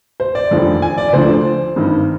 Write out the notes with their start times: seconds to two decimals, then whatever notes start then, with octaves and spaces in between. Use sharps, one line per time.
0.20 C5
0.35 D5
0.51 F1 D#2 D3 F3
0.82 G#5
0.98 D5
1.09 D5
1.13 D2 D3 F3 C5
1.76 G#1 G2 D#3